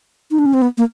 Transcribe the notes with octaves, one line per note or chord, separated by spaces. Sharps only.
D#4
D4
C#4
C4
B3
A#3